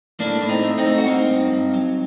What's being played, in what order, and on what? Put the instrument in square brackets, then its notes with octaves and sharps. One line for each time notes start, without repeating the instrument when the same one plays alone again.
[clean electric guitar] A2 A#3 D4
A2
C4 D#4
A3
C4 D#4
A3
F#4
A#3 C4 D#4
G2
G2
F#3